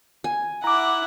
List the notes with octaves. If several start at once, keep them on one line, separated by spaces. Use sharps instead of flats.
G#5
E4 F#5 A#5 D6